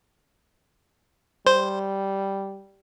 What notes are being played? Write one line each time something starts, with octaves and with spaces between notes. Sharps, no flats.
G3 C5